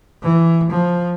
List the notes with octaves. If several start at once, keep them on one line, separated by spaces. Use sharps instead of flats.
E3
F3